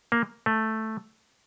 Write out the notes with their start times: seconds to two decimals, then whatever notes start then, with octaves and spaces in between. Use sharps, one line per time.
0.12 A#3
0.46 A3